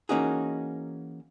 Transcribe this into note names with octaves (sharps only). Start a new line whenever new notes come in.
E3 A#3 C#4 D#4 F#4 G#4